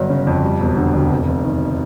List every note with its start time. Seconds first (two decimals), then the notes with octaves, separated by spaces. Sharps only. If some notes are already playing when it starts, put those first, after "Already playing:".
Already playing: G1 F#3
0.10 C#3
0.27 F2
0.44 G3
0.60 E1
0.77 D3
0.94 D2
1.11 F1
1.28 F1
1.45 D#3